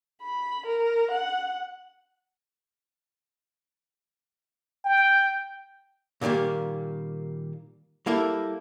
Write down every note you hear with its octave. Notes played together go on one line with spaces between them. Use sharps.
B5
A#4
F#5
G5
A#2 D3 D#3 G3 A#3
G3 A#3 E4 A4